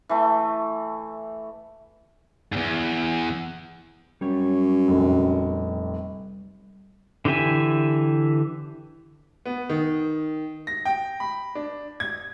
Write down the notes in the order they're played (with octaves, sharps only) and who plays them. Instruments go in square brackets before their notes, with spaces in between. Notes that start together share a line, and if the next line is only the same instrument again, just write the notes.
[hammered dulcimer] E3 A3
[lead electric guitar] E2 G#2
[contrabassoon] F#2 [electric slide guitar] G3 C#5
[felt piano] F1 A#1
[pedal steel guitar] D3 E3 G4 E5 G#5
[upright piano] B3
D#3
A#6
G5
B5
D4
G#6